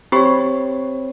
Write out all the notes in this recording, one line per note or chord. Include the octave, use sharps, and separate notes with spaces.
C4 G4 C#5 B5 C#6